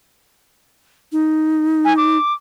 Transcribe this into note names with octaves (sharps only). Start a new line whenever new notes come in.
D#4
G#5
D6